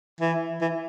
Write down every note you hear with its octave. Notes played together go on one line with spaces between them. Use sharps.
E3
E3